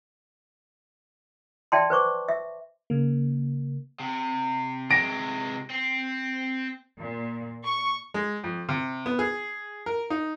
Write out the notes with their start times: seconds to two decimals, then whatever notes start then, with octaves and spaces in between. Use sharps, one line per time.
1.72 D5 E5 G5 A5 C6
1.90 B4 C5 C#6 D6
2.28 E5
2.90 C#3 A#3
4.00 C3
4.91 C3 G#3 A#6 D7
5.70 C4
6.98 A#2
7.64 C#6
8.14 G#3
8.44 F2
8.69 C3
9.06 B3
9.19 G#4
9.86 A#4
10.10 D#4